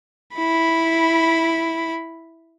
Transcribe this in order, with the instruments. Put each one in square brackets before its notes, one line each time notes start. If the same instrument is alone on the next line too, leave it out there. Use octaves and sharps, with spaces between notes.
[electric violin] E4 B5